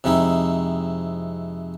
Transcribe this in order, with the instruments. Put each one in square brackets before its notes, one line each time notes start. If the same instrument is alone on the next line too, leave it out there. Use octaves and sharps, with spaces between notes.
[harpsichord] F2 C3 G#3 D#4 E4